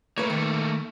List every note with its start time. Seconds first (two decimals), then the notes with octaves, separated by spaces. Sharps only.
0.18 A3 A#3 B4 C#5
0.30 D#3